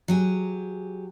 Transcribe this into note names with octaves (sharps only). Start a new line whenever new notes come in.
F#3 G4 G#4